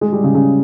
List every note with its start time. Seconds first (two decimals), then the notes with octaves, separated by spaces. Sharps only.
0.01 G#3
0.12 G3
0.24 C#3
0.35 C#3